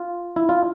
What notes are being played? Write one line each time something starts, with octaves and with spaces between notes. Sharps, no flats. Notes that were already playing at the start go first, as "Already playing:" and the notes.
Already playing: F4
E4
F4